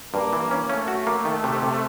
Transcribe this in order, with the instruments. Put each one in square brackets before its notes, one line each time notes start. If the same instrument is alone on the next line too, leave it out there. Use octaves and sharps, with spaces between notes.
[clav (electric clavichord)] G2 [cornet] A#3
[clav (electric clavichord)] E3
C#4
[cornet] A3 [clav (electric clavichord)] C#4
[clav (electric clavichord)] F#4
A#3
D#3
C3
C3